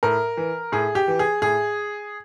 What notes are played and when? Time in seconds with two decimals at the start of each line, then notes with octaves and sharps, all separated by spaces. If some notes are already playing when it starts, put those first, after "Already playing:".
0.03 A2 A#4
0.37 E3
0.72 A2 G#4
0.95 G4
1.08 E3
1.19 G#4
1.42 A2 G#4